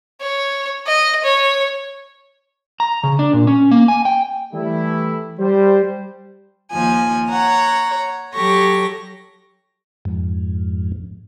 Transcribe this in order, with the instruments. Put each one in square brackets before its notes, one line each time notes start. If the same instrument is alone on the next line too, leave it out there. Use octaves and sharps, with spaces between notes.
[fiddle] C#5
D#5
C#5
[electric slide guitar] A#5
C#3
D4
A#2
C#4
A#3
G#5
G5
[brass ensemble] E3 G3 A3 E4
G3 C5
[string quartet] D#2 F3 G#5
C#5 F#5 A#5
F#3 G4 A4 C#6 A#6
[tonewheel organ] F2 G#2